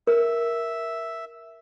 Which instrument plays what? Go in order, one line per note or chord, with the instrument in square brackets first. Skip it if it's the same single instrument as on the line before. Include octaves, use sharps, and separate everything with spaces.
[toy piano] A#4 [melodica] E5